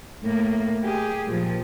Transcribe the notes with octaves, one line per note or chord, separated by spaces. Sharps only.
A2 A#3
G4 G#4
A#2 F3